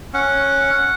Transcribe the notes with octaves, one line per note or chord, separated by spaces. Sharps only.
C#4 F#5